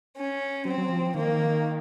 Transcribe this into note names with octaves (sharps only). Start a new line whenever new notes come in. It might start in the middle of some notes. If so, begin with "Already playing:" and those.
C#4
F#3 C4
F#3
F3
F3
D#3 A#3